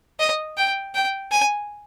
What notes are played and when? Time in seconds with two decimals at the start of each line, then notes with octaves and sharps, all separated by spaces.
0.20 D#5
0.57 G5
0.95 G5
1.32 G#5